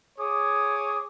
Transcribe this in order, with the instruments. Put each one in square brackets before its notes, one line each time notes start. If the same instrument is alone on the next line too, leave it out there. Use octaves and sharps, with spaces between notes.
[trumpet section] G#4 C#5 D6 D#6